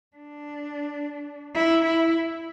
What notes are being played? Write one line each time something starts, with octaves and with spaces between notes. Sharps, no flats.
D4
E4
E4